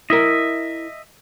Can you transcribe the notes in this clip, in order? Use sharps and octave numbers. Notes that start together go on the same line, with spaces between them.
E4 A#4 D#5 E5